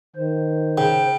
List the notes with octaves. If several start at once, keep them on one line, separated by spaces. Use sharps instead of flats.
D#3 C5
C#3 G5